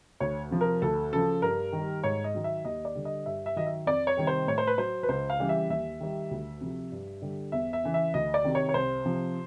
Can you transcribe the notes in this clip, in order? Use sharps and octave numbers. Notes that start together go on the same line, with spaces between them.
D2 C#5
C3 F3
A#4
D2 A4
C#3 F3 A4
G2 A#4
D#3
G3
G#2 C#5
D#5
D#3 F#3
E5
D#2 D#5
D5
D3 G3
D#5
G2 E5
E5
D#3 F#3 D#5
E5
F2 D5
C#5
C3 D#3 G3
C5
A2 C#5
C5
B4
F#3 C5
B4
C#2 C5
F5
C#3 E3 G3
E5
D#2 E5
D#3 G3
D2
C3 F3
G2
D3 G3
E2 E5
E5
C#3 E3
E5
D2 D#5
D5
C3 D#3
C#5
C#5
C2 C5
C3 F3